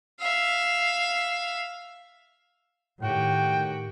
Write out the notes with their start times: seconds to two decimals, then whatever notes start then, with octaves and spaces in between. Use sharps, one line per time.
0.20 E5 F5
3.03 A2 D#3 F#4 G4 G5